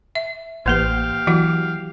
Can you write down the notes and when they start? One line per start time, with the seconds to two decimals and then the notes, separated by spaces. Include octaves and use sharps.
0.15 E5
0.66 A1 E3 A#3 G4 B4 F5
1.27 E3 F#3 F#4 F#5